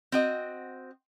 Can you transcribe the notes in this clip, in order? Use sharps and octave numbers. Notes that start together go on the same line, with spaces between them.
C4 F#4 D#5